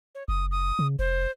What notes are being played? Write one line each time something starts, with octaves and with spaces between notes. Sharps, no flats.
C#5
F#1 D#6
D#6
C#3
F1 C5